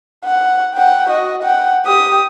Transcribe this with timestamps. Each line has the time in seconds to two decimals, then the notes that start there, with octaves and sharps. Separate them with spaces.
0.25 F#5
0.76 F#5 G5
1.09 F#4 D#5
1.43 F#5 G5
1.85 G4 D#6